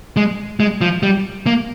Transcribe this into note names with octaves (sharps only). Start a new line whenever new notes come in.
G#3
G#3
F3
G3
A#3